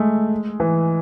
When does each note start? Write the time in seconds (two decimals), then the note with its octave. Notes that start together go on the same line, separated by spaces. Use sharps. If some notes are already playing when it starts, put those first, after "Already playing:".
Already playing: G#3 A3
0.60 E3